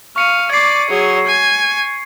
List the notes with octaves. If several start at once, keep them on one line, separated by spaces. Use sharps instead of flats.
F5 C#6 C#7 D#7
D5 D6 G#6 C7
F#3 G#4
G#5